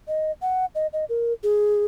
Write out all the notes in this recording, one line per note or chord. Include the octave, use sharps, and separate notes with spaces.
D#5
F#5
D#5
D#5
A#4
G#4